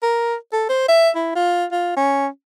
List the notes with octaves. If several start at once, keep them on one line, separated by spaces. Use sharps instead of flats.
A#4
A4
C5
E5
E4
F4
F4
C#4